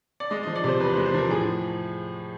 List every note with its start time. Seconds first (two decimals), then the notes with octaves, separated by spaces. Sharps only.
0.20 D5
0.30 G#3 D#5
0.43 D#5
0.47 F3
0.56 D5
0.64 C3 C5
0.80 E2 B4
0.93 C5
0.97 G#3
1.06 C5
1.14 F3 A#4
1.30 A2 G#4